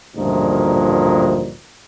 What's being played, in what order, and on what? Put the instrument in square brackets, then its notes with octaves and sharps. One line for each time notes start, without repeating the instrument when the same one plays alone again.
[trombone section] A1 D2 G2 A#2 F3 D#4